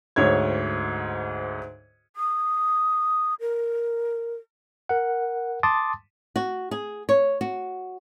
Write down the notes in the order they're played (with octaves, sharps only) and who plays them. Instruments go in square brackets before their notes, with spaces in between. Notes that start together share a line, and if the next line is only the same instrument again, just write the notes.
[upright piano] D2 G#2 C#5 G#6
[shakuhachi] D#6
A#4
[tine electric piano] A#4 F#5
A5 C6 D6 D#6 A6
[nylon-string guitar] F#4
G#4
C#5
F#4